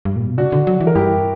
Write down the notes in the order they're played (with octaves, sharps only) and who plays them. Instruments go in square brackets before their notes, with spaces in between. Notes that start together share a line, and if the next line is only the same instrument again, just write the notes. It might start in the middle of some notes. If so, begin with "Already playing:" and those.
[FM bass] G2
A#2
B2
[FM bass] C#3 [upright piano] D4 F#4
[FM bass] D3
F#3
E3
[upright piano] A#4
[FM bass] G2 [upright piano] E4 G4